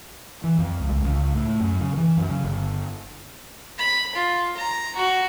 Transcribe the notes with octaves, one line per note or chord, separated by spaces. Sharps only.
E3
F2
C#2
C#2
C#2
A2
F#2
C#3
E3
F#2
C#3
G1
B5
F4
A#5
F#4